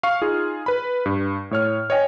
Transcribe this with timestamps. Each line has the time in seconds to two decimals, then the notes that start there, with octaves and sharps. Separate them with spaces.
0.03 F5 C#6 F6
0.22 D#4 F4 G#4
0.66 B4 B5
1.06 G2
1.51 A2 C#5 F6
1.90 C#5 D#5 G5 G#5